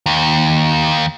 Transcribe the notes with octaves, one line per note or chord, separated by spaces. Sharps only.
D#2